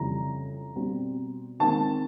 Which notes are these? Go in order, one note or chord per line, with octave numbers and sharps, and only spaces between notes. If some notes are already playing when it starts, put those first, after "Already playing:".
Already playing: F2 C#3 E3 G3 A#5
B2 G3 C4
D#3 G#3 C4 A5